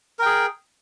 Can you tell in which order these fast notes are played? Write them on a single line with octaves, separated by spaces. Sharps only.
A#4 G5 G#4